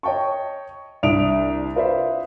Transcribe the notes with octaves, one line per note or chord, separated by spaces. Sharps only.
C#5 D#5 G5 A5 C#6
C2 D4 E5 D#6 D7 F7
F4 B4 C5 D5 E5 F5